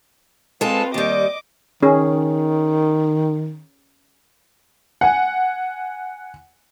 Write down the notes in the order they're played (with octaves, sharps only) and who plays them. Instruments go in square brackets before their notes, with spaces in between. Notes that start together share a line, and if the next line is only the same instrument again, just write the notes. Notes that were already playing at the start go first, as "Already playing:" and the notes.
[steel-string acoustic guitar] G#3 A4 [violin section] C4 F4 B4
[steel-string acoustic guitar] D#2 G3 [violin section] D#5 D6
[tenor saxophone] D#3 [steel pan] C#4 G#4
[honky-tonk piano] F#5 G#5